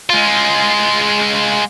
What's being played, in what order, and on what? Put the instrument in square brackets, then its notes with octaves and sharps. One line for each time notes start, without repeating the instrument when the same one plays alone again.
[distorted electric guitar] G#3 F4